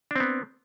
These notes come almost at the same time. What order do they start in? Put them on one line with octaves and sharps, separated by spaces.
D4 C4 B3